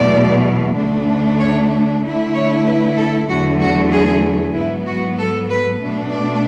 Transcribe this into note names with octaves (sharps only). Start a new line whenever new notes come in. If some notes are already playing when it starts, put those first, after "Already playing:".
Already playing: E2 B2 F#3 A3 D5
D2 D3 A3 D4
C#5
D3 A3 E4
C#5
B4
A4
E2 D3 F#3 A3 F#4
F#4
G#4
G#2 F#3 B3 E4
F#4
A4
B4
B2 A3 D4
D5